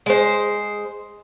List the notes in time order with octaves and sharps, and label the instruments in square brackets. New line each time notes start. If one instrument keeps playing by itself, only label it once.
[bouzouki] G#3 C5